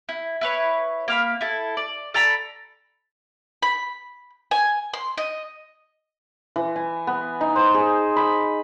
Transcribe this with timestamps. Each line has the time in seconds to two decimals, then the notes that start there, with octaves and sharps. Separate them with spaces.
0.09 E4
0.41 E4 B4 C#5
1.08 A#3 F5 B5
1.41 E4 A4
1.77 D5
2.14 A4 D5 A#5 B5
3.62 B5
4.51 G#5
4.94 C6
5.18 D#5
6.56 E3
6.76 G#5
7.07 B3
7.41 D#4
7.56 C5
7.74 G#4
8.16 B5